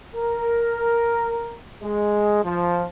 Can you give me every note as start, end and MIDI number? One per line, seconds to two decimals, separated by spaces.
0.15 1.59 70
1.82 2.40 56
2.45 2.85 53